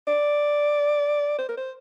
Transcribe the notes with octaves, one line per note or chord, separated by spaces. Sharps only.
D5
C5
A#4
C5